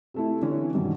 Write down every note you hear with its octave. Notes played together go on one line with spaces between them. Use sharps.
C3 A3 E4
D3 E3 C#4
G2 B2 D#3